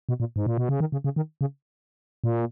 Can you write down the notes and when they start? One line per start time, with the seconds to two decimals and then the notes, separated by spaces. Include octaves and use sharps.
0.09 B2
0.20 A#2
0.36 G#2
0.46 A#2
0.58 B2
0.69 C#3
0.80 D#3
0.92 C#3
1.04 C#3
1.16 D#3
1.41 C#3
2.24 A#2